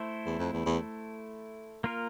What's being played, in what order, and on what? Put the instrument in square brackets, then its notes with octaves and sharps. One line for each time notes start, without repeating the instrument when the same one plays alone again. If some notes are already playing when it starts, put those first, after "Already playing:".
Already playing: [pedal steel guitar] A3 E4 A4 C5
[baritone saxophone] E2
F2
E2
E2
[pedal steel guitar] A#3 F4 A#4